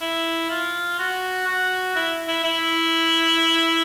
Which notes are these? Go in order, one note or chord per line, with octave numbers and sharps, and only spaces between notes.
E4
F4
F#4
F#4
E4
E4
E4